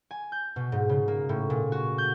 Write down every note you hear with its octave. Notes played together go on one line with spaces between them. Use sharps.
G#5
G6
B2
G#2
C#3
A#3
A2
A#2
F#4
G6